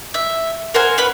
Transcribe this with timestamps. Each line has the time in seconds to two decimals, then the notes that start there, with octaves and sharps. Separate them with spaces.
0.14 E5
0.74 A#4 C5 F#5 G#5
0.98 C#4 B4 B5